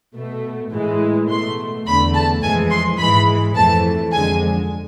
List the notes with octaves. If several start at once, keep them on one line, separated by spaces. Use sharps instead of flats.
B2 A3
A2 E3 G#3
B2 A3 C6
E2 D3 A3 B5
A5
F2 E3 G#3 G#5
C6
G#2 E3 G#3 B5
F2 E3 A3 A5
F2 D3 G#3 G#5